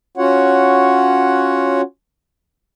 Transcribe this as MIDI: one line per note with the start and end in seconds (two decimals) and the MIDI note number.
0.17 1.81 61
0.17 1.81 65
0.17 1.81 66
0.17 1.81 73
0.17 1.81 78